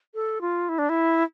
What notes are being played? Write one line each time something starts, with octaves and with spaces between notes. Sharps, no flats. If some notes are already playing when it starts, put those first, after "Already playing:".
A4
F4
E4
D4
E4